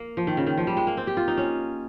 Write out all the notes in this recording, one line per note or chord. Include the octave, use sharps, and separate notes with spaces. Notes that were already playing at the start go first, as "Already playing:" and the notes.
Already playing: A#3
F3
D#3
C#3
D#3
F3
G3
G#3
A#3
C4
G4
F4
D#4
C#4